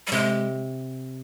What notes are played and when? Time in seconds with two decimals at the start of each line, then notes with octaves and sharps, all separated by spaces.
0.07 G3
0.12 C3 G#3